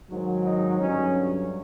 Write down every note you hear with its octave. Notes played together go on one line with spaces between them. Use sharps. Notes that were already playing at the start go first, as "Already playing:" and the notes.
G#2 D#3 F#3
D#4
G2 D3 F#3 C#4